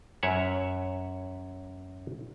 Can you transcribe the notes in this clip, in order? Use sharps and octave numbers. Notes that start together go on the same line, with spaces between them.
F#2 C#5 E5 F#5